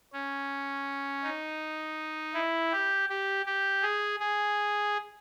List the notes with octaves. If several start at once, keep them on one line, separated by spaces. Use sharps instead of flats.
C#4
D#4
E4
G4
G4
G4
G#4
G#4